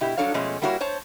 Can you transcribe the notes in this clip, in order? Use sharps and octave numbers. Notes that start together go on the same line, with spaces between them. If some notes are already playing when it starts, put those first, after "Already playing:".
B2 E4 G4
F#3 G3 D4 A4 C#5 F5
B2 F3 G#3 A3 C#4
G3 A#3 E4 F#4 A#4 C#5
C5 C#5 A5